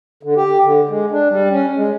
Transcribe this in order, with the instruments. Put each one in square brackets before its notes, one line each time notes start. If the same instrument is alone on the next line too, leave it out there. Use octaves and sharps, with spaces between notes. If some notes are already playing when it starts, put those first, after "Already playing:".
[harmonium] D3
G4
D3
G#3
D4
G3
C#4
G#3